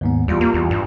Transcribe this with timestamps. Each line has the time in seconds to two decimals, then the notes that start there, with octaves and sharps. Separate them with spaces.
0.01 D#2 G#2 B3
0.28 E2 G3 F4
0.41 A#3
0.54 E2
0.71 G2